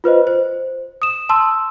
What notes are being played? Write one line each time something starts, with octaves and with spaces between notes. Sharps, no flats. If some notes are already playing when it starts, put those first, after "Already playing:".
F4 B4 C5 D#5
C5
D#6 E7
A5 C6 E6